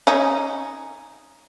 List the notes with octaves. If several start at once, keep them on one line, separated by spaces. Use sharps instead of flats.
C#4 D#4